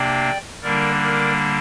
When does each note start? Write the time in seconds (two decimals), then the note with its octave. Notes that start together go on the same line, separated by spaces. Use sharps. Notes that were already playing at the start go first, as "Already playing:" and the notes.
Already playing: C3 A#3 D4 D5 G5
0.62 D3 G3 A#3 D4 A#4 D5
1.03 A#4 D5